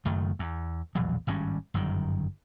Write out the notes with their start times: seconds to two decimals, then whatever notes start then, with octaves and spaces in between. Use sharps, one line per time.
0.05 F#1 F#2 D#3 A3
0.39 E2
0.95 E1 A#1 E2 F#3
1.27 G#1 G2 G3 C#4
1.74 G1 F#2 D#3